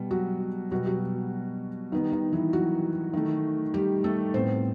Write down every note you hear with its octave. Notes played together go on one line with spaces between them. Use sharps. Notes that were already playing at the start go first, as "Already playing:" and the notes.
Already playing: B2 G3 B3
F#3 F#4
B2 F#3 G3 B3 F#4
F#3 F#4
D#3 G3 B3 D#4
D#3 D#4
E3 E4
F#3 F#4
D#3 A3
G3 G4
A3 A4
A2 G3 B3 C4 C5